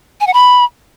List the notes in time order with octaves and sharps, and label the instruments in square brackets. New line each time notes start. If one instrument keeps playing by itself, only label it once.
[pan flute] G#5
F#5
B5